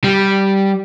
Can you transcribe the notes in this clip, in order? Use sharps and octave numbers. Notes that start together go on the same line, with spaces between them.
G3